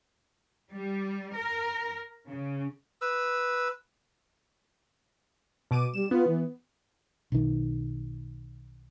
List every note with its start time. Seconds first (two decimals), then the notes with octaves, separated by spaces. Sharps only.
0.71 G3
1.35 A#4
2.28 C#3
3.01 B4 E6
5.71 B2 D6 D#7
5.94 G3 E7
6.11 B3 F4
6.27 E3
7.32 B1 D#3